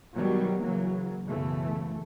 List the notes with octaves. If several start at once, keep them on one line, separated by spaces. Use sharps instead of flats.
B2 D#3 F#3 G3
C#3 E3 F#3 A#3
B1 F#2 C#3 E3 A3